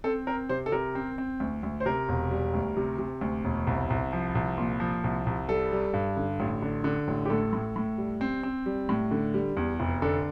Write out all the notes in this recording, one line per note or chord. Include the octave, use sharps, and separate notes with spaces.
C4 A4
C4 A#4
C3 C5
A4
C3 A#4
C4
C4
D2
D2
C5
C3 A#4
E1
G3
D2
C3
C3
D2
E1
C2
C2
F3
C2
A#2
F3
C2
C2
G3 A4
G3
G2
D3
A1
D3
D3
A1
G4
A2 A4
A2
A2
G3
C4
C4
G3
A2
D3
G3
E2
F1
D3 A4